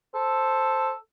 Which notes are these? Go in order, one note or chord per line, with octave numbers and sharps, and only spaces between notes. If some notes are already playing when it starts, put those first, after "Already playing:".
A4 C5